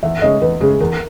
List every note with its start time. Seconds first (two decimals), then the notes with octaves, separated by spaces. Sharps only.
0.03 E2 E5
0.22 C#3 G#3 C#4 D#5
0.42 E2 B4
0.60 C#3 G#3 C#4 G#4
0.80 E2 A#4